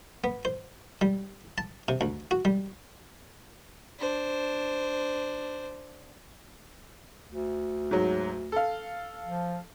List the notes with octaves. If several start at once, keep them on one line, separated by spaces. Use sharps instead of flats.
B3
C5
G3
A5
C3
D2
F#4
G3
D4 C5
D2
G#2 F#3
A4 F5
F3